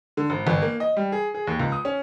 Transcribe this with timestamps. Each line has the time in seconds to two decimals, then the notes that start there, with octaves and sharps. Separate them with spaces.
0.17 D3
0.30 G#1
0.47 G1
0.62 A#3
0.80 D#5
0.97 G3
1.12 G#4
1.34 G#4
1.47 D#2
1.59 C#2
1.72 D#6
1.85 C#4